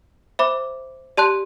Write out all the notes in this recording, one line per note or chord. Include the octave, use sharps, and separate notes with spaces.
C5 E5 B5 D6
G4 D5 A5 C6 F#6